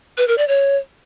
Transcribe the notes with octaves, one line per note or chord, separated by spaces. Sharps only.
B4
A#4
D5
C#5